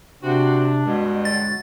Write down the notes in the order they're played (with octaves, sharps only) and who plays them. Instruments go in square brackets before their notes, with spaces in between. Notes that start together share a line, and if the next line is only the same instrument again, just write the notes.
[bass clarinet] C3 [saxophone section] C4 F#4 [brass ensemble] D4
[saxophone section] G2 B2 [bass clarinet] G#3
[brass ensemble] G1 F#3 [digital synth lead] A6